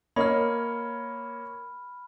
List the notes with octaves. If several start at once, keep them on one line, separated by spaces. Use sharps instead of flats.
A#3 C#5 D#5 B5 F6